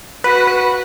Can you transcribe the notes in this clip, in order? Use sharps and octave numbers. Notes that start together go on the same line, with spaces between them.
F#4 B4
B4